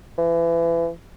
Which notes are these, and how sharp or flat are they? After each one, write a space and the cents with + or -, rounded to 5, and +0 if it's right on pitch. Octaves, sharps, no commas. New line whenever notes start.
E3 +30